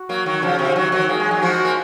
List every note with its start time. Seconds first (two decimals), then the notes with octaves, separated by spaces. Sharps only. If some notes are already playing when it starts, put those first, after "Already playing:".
Already playing: F#4
0.09 F#3 A#3
0.26 D#3 F#3
0.42 C#3 F3 F#4
0.59 C3 D#3
0.76 D#3 F#3
0.92 D#3 F#3
1.09 A#3 G#4
1.20 G#3
1.31 F#3
1.42 F3 G#3 F#4
1.65 A#3